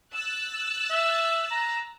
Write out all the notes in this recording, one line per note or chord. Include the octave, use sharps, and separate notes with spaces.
E6 F#6 A6
E5
A#5